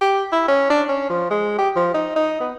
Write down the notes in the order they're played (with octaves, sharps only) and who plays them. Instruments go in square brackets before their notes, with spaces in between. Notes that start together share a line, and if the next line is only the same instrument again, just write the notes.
[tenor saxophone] G4
E4
C#4
D4
C#4
F3
G#3
G4
F3
D#4
D#4
B3